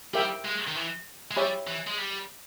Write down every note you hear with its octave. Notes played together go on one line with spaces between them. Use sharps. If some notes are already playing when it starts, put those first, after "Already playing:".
G3 G4 A#4 E5 G5
G#3
D#3
E3
G#3
G3 G4 C#5 E5 G#5 B5
E3
G#3
G3